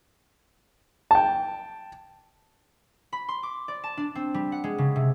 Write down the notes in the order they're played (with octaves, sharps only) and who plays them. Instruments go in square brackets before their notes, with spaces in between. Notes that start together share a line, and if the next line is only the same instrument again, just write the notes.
[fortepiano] G5 A5
[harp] B5
C6
D6
D5
A5
D4
C4
G3
F#5
G#3
C#3
C3